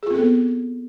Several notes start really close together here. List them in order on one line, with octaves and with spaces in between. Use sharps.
G#4 F4 C4 A4 B3